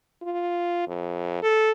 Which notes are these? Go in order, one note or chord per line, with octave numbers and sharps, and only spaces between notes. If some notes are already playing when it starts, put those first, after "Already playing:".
F4
F2
A4